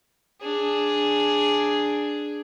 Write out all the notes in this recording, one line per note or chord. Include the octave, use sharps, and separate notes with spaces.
D4 G#4